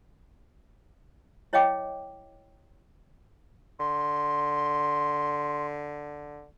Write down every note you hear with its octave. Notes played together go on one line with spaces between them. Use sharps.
E4 C#5 D#5 F5 G5 D6
D3 C6